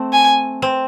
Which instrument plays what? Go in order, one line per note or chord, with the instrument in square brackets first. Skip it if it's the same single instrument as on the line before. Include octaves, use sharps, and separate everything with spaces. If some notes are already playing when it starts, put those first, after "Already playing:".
Already playing: [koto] A3 C4
[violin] G#5
[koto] C4